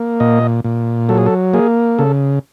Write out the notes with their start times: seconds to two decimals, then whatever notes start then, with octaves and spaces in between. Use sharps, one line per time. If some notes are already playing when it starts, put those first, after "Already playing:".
Already playing: A#3
0.20 A#2 D#5
0.64 A#2
1.09 F#3 A4
1.18 G#4
1.26 A4
1.54 A#3 G#4
1.98 C#3 A4